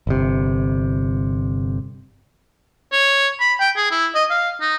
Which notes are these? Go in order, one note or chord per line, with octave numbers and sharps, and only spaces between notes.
G1 C3
C#5
B5
G5
G#4
E4
D#5
F5
D#4